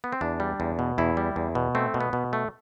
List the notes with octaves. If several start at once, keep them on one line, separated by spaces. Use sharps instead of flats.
B3
C4
E2 D4
G3
E2
B2
E2 E4
G3
E2
B2
A3 C4
B2
B3
B2
A3